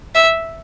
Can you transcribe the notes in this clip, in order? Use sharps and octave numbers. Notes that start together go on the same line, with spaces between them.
E5